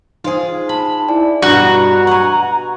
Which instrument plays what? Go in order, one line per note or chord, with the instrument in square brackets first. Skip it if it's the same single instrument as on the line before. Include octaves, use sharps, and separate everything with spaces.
[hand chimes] D#4 C5 [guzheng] F4 G#4
[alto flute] A5 [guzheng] B5
[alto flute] E4 [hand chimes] D5 G#5
[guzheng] G2 B2 [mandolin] F#4 [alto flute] A#5
[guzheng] F#5 G#5 [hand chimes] C#6